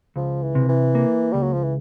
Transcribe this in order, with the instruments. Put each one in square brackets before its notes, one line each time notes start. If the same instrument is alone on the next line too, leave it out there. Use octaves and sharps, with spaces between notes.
[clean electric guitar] C#2 [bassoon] F3
[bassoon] E3
[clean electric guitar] C3
[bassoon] E3
[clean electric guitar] A#3
[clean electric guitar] C#2 [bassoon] G3
[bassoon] F#3
F3
E3